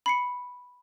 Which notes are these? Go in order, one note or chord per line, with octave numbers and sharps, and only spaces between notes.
B5 C7 C#7